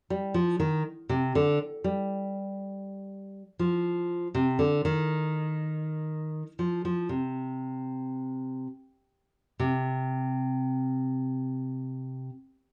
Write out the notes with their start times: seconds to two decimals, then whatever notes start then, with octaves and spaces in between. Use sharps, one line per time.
0.10 G3
0.34 F3
0.60 D#3
1.09 C3
1.35 D3
1.84 G3
3.59 F3
4.35 C3
4.59 D3
4.85 D#3
6.59 F3
6.85 F3
7.09 C3
9.60 C3